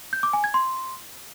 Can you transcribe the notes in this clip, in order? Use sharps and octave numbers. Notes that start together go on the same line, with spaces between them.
G6
D6
G#5
G#6
C6